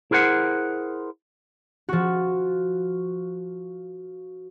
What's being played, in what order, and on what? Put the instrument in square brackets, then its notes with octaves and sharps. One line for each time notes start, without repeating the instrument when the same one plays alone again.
[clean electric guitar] E4 G#4 A#4 C5 F#5
[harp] F3 F#4